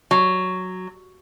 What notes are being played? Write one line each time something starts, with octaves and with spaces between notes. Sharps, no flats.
F#3